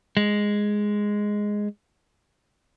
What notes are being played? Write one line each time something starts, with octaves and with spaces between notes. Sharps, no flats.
G#3